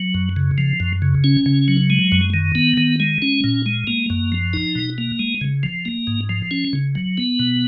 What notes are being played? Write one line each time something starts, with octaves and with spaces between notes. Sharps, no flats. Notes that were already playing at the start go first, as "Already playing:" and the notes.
Already playing: F#3
F#2
C#3
F3
F#2
C#3
C#4
C#3
F#3
G#3
F#2
D#3
B3
D#3
G#3
C#4
A#2
G#3
A#3
F#2
F3
D#4
B2
A#3
G#3
C#3
F3
A#3
G#2
F3
C#4
C#3
F#3
B3
B2